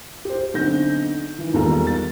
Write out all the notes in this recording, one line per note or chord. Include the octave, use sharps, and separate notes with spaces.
G4 C5
B1 D3 C4 G6 A#6
D#3 E3
E1 D#2 G3 F4 A4 A#5
A6